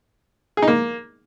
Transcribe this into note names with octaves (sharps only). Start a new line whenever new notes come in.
G#4
D#4
A#3